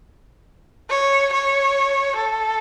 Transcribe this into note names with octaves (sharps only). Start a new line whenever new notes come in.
C#5
C#5
A4